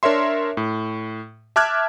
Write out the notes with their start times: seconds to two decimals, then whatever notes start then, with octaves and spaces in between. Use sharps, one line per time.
0.03 D4 A#4 C#5 E5 C6
0.57 A2
1.56 E5 A5 D6 F6 F#6 G#6